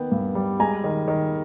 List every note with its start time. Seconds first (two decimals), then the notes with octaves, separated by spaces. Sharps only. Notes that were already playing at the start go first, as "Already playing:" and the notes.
Already playing: D#3 A#3 B3 G5
0.12 G2
0.35 G3
0.60 G#3 G#5 A#5
0.84 D#3
1.08 D#3